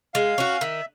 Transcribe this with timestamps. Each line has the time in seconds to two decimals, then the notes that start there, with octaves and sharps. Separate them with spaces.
0.14 G#3 F5
0.38 C#4 F#4
0.61 D#3 E5